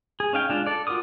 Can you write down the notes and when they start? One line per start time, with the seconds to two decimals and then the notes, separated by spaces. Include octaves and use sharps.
0.20 G#4
0.33 C#4 D#4 F5 G5
0.49 G#3 D4 F4
0.67 A4 D5
0.87 F4 F#4 A#4 D6 D#6